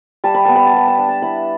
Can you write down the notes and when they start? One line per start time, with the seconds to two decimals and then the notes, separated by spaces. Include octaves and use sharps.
0.24 G3 A5
0.34 B5
0.45 B3 A5
0.55 B5
0.66 A5
0.73 G3 B5
0.88 A5
0.98 D4 B5
1.09 A5
1.22 E4 B5